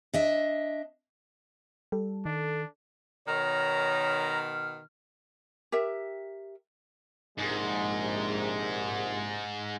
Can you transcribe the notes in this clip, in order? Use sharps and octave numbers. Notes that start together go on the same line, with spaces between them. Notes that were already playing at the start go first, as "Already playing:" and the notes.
D4 D#5 E5
G3 A4
D#3 D4
B2 D#3 C#5 A#5 F6
G4 A#4 E5
A#1 G#2 C3 G#3